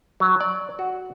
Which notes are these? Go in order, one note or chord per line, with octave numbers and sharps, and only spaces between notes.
F#3
D5
F#4